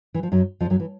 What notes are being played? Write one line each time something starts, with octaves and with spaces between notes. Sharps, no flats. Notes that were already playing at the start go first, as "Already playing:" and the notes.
E3
F3
F#2 F#3
F2 F3
F#2 F#3
E3